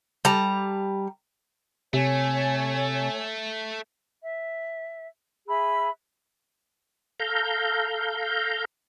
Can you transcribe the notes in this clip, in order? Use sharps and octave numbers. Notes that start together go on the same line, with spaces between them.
G3 A5 A#5
C3 A3 C#5 G#5
E5
G#4 E5 B5 E6
A4 F5 A#5 G6